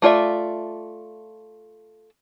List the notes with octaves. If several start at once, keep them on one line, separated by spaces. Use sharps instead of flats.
A3 F4 D5 E5